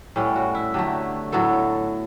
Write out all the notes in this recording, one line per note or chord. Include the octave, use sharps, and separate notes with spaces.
A2 G3 B3 C#4
F#4
E4
D3 F#3 A3 G4
A2 F#3 B3 A4